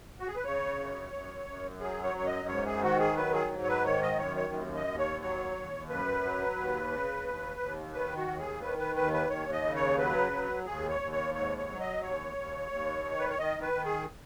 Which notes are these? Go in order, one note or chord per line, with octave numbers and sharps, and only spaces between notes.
F#4
G#4
B4
C#3 C#5
F#2
F#2
F#2
F#3 G#4
C#5
F#2 C#5
D#5
G#2 C#5
G#4
D#3 F#4
G#4
F#3 B4
G#4
G#2
C#5
B4
D#3 C#5
D#5
F#2 C#5
C#5
D#2
D#5
D#2
C#5
F#3 C#5
D#2
F#2 B4
F#3
D#2
C#3
D#2
D#2
D#3 B4
F#4
D#2
G#4
D#3 B4
B4
D#2 B4
B4
D#2 C#5
D#5
C#3
C#5
F#3 B4
F#3
D#2 G#4
C#5
D#2
C#5
G#2 C#5
C#5
F#3
D#5
D#2 C#5
D#2
D#2
D#3
B4
C#5
D#3 D#5
B4
D#3
G#4